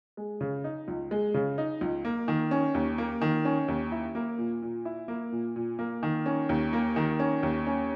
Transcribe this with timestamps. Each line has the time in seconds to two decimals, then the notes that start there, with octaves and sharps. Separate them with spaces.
0.17 G#3
0.41 C#3
0.64 D#4
0.88 C#2
1.11 G#3
1.34 C#3
1.58 D#4
1.81 C#2
2.05 A#3
2.28 D#3
2.51 C#4
2.74 D#2
2.98 A#3
3.21 D#3
3.45 C#4
3.68 D#2
3.92 E4
4.15 A#3
4.38 A#2
4.62 A#2
4.85 E4
5.08 A#3
5.32 A#2
5.56 A#2
5.79 A#3
6.03 D#3
6.26 C#4
6.49 D#2
6.73 A#3
6.96 D#3
7.20 C#4
7.43 D#2
7.67 C#4